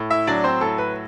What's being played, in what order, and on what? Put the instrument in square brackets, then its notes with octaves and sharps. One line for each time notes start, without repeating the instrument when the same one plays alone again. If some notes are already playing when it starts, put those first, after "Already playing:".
Already playing: [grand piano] A2
E4 E5
F#3 D4 D5
C4 C5
A2 A4
B4